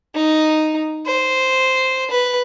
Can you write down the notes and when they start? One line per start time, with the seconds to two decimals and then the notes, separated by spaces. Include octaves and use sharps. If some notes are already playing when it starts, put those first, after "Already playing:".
0.15 D#4
1.06 C5
2.11 B4